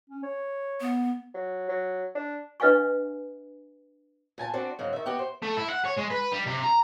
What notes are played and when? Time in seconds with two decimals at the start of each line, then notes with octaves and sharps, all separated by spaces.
0.09 C#4
0.23 C#5
0.80 B3
1.35 F#3
1.69 F#3
2.15 D4
2.60 D4 B4 D#5 F5 G#5 C#6
4.38 A#2 G#5 A5
4.53 C4 D4 F#4
4.79 G#2 C#3 F#3
4.93 D#3 E5
5.06 B3 F#4 G4 G5
5.19 C5
5.42 A3
5.57 E4
5.69 F#5
5.85 C#5
5.97 G#3
6.10 B4
6.32 G3
6.46 C3
6.63 A#5